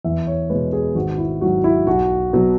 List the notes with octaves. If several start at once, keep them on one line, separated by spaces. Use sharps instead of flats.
E2 E5
C#5
B2 G#3 B4
G#4
G#1 F#4
E4
G#2 F#3 F#4
E4
B1 F#4
B2 F#3